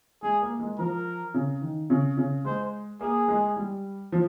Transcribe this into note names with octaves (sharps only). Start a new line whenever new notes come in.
G#3 G#4
A#3
G#3
F3 A#4
C#3
D#3
C#3
C#3
G#3 C5
A#3 G#4
G#3
G3
F3